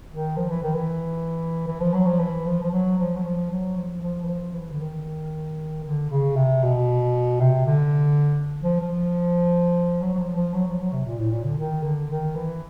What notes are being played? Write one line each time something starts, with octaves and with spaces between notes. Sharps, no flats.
D#3
F3
E3
D#3
E3
E3
F3
F#3
F3
E3
F3
F3
F#3
F3
F#3
F3
F#3
F3
F3
E3
F3
E3
D3
D#3
D3
C#3
C3
B2
C3
D3
F3
F3
F#3
F#3
F3
F3
F#3
F3
F#3
C3
A#2
A2
A#2
D3
D#3
D3
D#3
E3